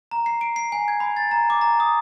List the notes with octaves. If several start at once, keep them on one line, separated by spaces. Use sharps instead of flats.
A#5
C7
D7
C7
G#5
G#6
B5
A6
A#5
D6
A#5
D#6